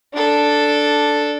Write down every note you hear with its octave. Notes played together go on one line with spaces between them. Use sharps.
D4 A4